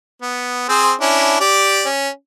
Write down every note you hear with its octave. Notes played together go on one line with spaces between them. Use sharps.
B3
C4 G#4 C5
C#4 D4 E4
G4 D5
C#4